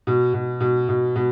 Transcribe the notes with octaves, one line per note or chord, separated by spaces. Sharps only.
B2
B2
B2
B2
B2